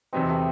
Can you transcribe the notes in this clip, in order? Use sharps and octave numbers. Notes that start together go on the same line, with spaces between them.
E2 C3 F#3 B3 C4 D#4
A3